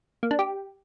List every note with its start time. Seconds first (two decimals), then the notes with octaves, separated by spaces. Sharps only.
0.23 A#3
0.31 D4
0.39 G4